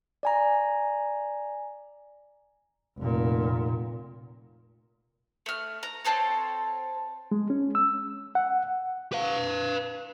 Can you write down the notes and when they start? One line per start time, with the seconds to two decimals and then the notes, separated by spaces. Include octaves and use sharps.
0.23 D5 G#5 A#5
2.98 F1 A#2
5.46 A3 F6
5.83 A#5
6.04 C4 A4 C5 C#5
7.31 G#3
7.50 C#4
7.75 E6
8.35 F#5
9.12 B4 F5